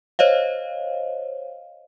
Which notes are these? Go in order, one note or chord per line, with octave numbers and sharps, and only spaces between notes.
C5 C#5 D#5 F5